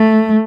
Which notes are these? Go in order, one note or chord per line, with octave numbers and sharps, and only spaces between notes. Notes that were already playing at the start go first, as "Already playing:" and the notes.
Already playing: A3